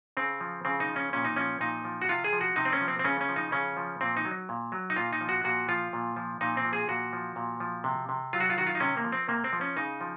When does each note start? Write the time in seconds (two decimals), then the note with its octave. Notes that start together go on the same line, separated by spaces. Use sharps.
0.17 C#3 C4
0.41 F3
0.65 C#3 C4
0.80 D#4
0.88 F3
0.96 C#4
1.13 A#2 C#4
1.25 D#4
1.36 F3 C#4
1.61 A#2 D#4
1.85 F3
2.02 F#4
2.09 C3 F4
2.24 G#4
2.33 F3
2.41 F#4
2.56 C3 D#4
2.65 C4
2.73 C#4
2.81 F3
2.88 C4
2.99 C4
3.04 C#3 C#4
3.21 C#4
3.29 F3
3.36 D#4
3.52 C#3 C#4
3.77 F3
4.01 A#2 C4
4.17 D#4
4.25 F#3
4.49 A#2
4.72 F#3
4.90 D#4
4.96 A#2 F4
5.13 D#4
5.21 F3
5.29 F#4
5.44 A#2 F#4
5.69 F3 F4
5.93 A#2
6.17 F3
6.41 A#2 D#4
6.57 C4
6.65 F3
6.73 G#4
6.89 A#2 F#4
7.13 F3
7.36 A#2
7.60 F3
7.84 C3
8.09 C3
8.33 F#3 F4
8.40 F#4
8.50 F4
8.57 D#3 F#4
8.67 F4
8.75 D#4
8.80 C3 C#4
8.97 A#3
9.04 F3
9.12 C4
9.28 C3 A#3
9.44 C4
9.53 F3
9.61 C#4
9.77 C#3 D#4
10.01 F3